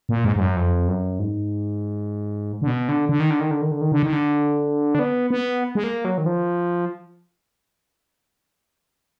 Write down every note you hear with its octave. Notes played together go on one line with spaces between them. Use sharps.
A#2
G#2
G#2
F#2
F2
F#2
G#2
D3
B2
D3
D3
D#3
D3
D#3
D3
D#3
D3
D#3
D3
D#3
D3
D4
B3
B3
G#3
A#3
F#3
D#3
F3